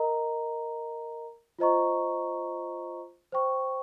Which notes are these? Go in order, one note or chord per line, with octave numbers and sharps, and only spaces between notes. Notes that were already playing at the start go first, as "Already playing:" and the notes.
Already playing: A#4 D#5 A#5
F4 C5 D#5 A#5 C#6
C5 G5 C#6